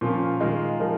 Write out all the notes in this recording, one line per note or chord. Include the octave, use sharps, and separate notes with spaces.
A#2 F3 C#4 A#4
D#3 G#3 F4 A#4
F3 G#3 D#4 A#4